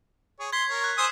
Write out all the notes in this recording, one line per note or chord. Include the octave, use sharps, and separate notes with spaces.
G#4 C#5
C6 G#6 B6 C7
A#4 C#5
F#6
C5 G#5 D#6 E6 C7 E7